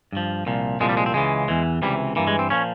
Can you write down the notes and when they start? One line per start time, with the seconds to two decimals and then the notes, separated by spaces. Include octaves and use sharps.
0.12 G2 F3
0.46 C2 A#2 F3
0.80 C2 A#2 F3 G#3
0.89 G3
0.97 G#3
1.06 C4
1.14 C#2 C#3 E3 G#3
1.48 E2 E3
1.82 C#2 C3 E3 G3
2.16 G2 E3 A#3
2.27 G#3
2.39 C4
2.50 A#2 F3 C#4